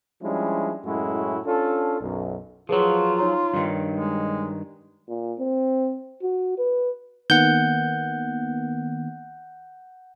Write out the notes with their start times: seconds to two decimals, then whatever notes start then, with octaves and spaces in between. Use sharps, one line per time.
0.21 F3 G3 G#3 C#4 D4 E4
0.84 F#2 A2 G#3 C#4 E4 F#4
1.44 C#4 D4 F4 A4
2.00 B1 F#2
2.69 F3 F#3 F4 G#4 B4 C#5
3.19 D#4 C#5 A#5
3.54 G2 D#3
3.94 G#3
5.08 A#2
5.39 C4
6.23 F#4
6.58 B4
7.30 D#3 A#3 B3 F#5 G6